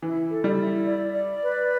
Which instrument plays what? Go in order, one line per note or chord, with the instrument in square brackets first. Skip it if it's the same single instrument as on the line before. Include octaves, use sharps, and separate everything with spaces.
[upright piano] E3 [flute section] E4
[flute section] A4
[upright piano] G3
[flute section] E4
D5
D5
B4